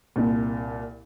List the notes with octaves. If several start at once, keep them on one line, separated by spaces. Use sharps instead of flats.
C2 A#2